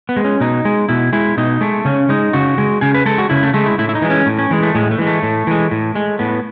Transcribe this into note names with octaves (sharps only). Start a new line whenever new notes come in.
B3
G#3
C#4
B2 D#4
G#3
B2 E4
G#3 E4
B2 D#4
G#3 A3
C#3 C#4
G#3 D#4
C#3 F#4
G#3
C#3 G#4
B4
G#3 A4
F#4
C#3 E4
A3
G#3 A3
E4
A2 E4
E4
D#4
E3 G#3
C#4
A2
C#4
E3 G#3
A3
A2 G#3
A3
E3 G#3
A3
A2
E3 G#3
A2
G#3
A2 B3